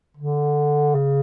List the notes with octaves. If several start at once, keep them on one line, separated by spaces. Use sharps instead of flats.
D3
C#3